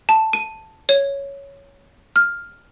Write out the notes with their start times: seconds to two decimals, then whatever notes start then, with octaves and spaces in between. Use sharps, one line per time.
0.09 A5
0.33 D#7
0.89 C#5
2.16 F6